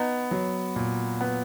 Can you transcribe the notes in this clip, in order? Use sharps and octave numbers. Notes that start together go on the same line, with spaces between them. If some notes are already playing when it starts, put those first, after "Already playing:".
Already playing: B3 D#4
F#3
A#2
B3